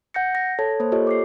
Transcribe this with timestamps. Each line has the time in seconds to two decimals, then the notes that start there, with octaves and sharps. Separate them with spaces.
0.14 F#5 G6 A#6 C#7
0.35 A#6
0.59 A4 C#5 A5 G#6
0.80 A#3 C5
0.92 F4 G4 A4 A#4 C#5 D#5
1.07 D6 C7